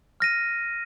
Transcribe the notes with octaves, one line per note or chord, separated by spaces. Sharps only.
F6 A#6 D#7